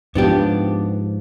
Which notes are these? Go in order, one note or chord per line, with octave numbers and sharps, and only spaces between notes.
G#2 F3 B3 D4 G4